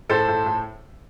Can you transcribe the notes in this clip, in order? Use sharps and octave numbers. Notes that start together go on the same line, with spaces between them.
A2 A4 C5
A2
A2